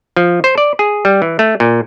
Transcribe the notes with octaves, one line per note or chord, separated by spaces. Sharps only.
F3
C5
D5
G#4
G3
E3
A3
A#2